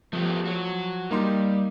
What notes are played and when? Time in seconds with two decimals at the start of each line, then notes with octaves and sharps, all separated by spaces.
0.13 F3 A3 B3 G4
0.45 F#4 C#5
1.11 G3 A#3 D#4 C6